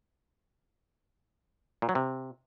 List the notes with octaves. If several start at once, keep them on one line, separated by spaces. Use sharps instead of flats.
A#2
F#3
C3